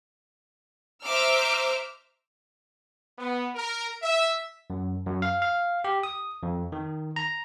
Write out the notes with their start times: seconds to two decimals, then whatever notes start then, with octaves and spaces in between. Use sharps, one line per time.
1.04 C5 E5 A#5 D6 E6 F6
3.18 B3
3.55 A#4
4.03 E5
4.70 F#2
5.07 F#2
5.22 F5
5.42 F5
5.84 G4
6.03 D#6
6.43 F2
6.72 D#3
7.16 A#5